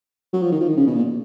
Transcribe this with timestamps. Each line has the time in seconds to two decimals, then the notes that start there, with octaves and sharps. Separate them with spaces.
0.33 F#3
0.42 F3
0.52 D#3
0.60 F3
0.69 D#3
0.77 C#3
0.87 B2
0.96 A#2